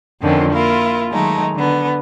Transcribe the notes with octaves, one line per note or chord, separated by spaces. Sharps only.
F2 D3 D#3 F3 C4 C#4
A#3 E4 F4 A#4
D#3 F#3 G#3 A3 D#4
D3 B3